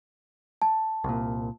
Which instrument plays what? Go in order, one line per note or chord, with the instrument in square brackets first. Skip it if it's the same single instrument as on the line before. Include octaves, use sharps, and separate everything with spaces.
[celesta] A5
[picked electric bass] C2 A#2